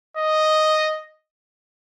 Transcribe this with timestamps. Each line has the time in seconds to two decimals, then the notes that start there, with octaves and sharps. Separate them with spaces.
0.17 D#5